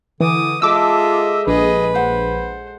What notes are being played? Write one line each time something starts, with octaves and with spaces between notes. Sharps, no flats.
D3 E3 D6 D#6
G#3 F4 A4 D#5 E5 D6 E6
A#1 G#4 B4 D#5
C5 F#5